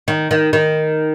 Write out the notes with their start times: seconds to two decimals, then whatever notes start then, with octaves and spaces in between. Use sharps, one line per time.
0.08 D#3
0.31 D#3
0.53 D#3